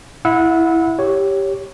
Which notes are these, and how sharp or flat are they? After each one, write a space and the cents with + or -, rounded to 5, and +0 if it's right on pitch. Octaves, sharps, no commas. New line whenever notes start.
E4 +0 F#5 -25 E6 -25
G4 +0 C#5 +0